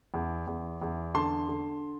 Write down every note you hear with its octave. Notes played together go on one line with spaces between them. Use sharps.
E2
E2
E2
D3 A5 C6
D3